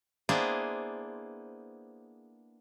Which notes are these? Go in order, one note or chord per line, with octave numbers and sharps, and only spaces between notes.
A#3 B3 D4 E4 G#4 C5